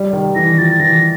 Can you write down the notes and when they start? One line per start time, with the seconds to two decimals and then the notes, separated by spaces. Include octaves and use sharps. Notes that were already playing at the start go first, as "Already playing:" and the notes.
Already playing: G3
0.13 D#3
0.35 E3 A#6
0.58 F3 A6
0.80 E3 A#6